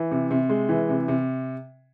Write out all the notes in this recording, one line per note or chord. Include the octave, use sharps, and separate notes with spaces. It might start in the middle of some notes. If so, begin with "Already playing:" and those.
Already playing: E3
C3
C3
G#3
E3
C3
C3